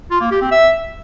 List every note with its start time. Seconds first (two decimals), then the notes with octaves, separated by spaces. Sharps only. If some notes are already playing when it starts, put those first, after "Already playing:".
0.11 F4
0.21 A#3
0.31 G4
0.41 C4
0.51 E5